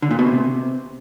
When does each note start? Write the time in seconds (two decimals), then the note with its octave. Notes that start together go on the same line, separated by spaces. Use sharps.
0.02 D3
0.11 A#2
0.19 B2
0.27 C3